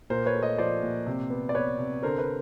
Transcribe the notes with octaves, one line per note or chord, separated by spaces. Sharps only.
A#2 A#4 C5
B4 C#5
A3
C#5 D#5
F3 C5 D5
A#2
C3
B3
D5
B3 B4 C#5
C3
D3 A#4 C5
B4